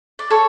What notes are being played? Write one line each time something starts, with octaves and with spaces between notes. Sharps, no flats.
D5
A4 C#5